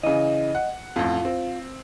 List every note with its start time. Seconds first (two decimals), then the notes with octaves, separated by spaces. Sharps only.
0.03 C#3 E3 D#5
0.55 F#5
0.96 A1 F2 F4
1.25 C4